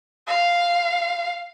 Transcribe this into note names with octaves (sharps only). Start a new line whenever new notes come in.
F5